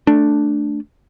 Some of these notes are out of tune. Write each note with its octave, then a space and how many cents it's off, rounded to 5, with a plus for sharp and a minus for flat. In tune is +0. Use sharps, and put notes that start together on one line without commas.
A3 +0 D4 +0